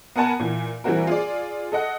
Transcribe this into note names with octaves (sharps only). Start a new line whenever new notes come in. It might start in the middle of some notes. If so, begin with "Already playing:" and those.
B3 A#4 F#5 G#5 A5 B5
A#2 E3
E3 G3 A#3 C4 F#4 A#4
F4 G#4 D5
A4 D#5 F#5